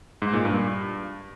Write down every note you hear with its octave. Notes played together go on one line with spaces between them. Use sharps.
G#2
A#2
G2